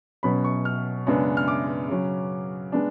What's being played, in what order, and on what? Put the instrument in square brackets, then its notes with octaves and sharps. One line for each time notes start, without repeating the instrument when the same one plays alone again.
[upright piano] B2 F#3 C#4 B5
C#6
F6
F#2 C#3 G#3 B3 D4
F6
D6
C#3 F#3 C#4
G#3 B3 D4